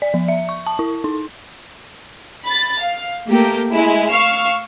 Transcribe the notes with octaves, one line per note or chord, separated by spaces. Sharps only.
D5
F3
E5
C#6
A5
E4
D#4
B5 A6
F5
A3 A#3 G4 A4 A#4 G5
G#3 E4
F5 C#6 E6 F6 C7